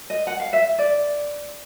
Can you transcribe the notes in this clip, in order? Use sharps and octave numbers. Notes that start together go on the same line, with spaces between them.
D#5
F#5
F5
E5
D5